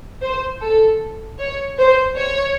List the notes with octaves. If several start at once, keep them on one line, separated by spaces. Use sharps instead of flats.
C5
A4
C#5
C5
C#5